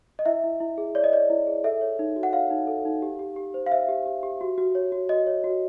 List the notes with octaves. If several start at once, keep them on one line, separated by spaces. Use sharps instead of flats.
D#5
E4 E5
E4
E4
G#4
C#5 D5
D#5
C#5 D5
E4
G#4
A4 E5
C#5
D#4
F#4
F#5
C#5 F5
D#4
A4
D#4
G4
G4
G4
C5
F5
C5 E5
G4
G4
G4
F#4
F#4
C#5
F#4
F#4 D#5
C#5
F#4